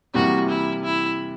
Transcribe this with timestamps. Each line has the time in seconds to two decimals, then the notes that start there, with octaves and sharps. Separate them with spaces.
0.14 C3 E3 G3 A#3 F#4
0.49 E4
0.84 E4